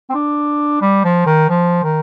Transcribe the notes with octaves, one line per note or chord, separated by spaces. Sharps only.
C4
D4
G3
F3
D#3
F3
D#3